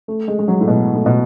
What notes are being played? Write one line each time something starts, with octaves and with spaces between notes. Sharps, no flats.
A3
G#3
G#3
F#3
A2
B2
A2
B2